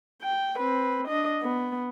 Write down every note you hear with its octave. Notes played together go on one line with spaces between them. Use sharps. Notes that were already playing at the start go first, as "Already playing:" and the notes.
G5
C4 B4
D4 D#5
B3